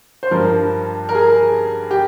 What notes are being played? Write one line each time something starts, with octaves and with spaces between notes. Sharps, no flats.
C5
G2 F3 A#4
A#4
G#4
G4